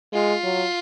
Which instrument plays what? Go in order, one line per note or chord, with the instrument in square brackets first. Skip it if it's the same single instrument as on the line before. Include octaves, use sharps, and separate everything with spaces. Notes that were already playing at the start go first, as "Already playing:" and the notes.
[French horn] G#3 [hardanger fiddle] F4
[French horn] F#3